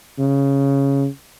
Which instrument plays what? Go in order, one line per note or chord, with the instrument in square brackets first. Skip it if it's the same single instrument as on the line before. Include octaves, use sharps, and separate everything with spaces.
[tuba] C#3